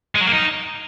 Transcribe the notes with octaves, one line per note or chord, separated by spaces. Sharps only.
G#3
F#3
A#3
D#4